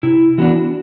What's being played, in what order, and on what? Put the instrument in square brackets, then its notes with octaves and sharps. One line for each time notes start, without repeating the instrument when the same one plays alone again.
[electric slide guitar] C3 E4
E3 B3 D4 F#4